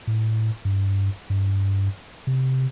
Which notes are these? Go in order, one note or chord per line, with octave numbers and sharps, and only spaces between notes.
A2
G2
G2
C3